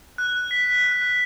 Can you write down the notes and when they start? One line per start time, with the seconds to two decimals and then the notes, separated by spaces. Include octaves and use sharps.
0.18 F#6
0.51 B6
0.84 F#6